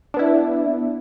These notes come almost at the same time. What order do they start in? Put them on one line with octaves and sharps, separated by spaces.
D4 B3 E4